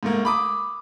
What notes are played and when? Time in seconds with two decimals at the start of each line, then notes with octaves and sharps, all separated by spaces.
0.03 G#2 A3 A#3
0.25 B5 D6 D#6